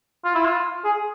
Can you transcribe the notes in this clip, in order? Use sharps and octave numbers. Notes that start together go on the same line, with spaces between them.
F4
E4
F4
G#4